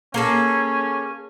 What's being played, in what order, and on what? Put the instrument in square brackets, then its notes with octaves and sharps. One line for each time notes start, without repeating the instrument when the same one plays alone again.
[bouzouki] A#3 G#4 A4 [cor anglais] C#4